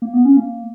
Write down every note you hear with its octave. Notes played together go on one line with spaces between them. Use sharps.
A#3
B3
C#4
A#3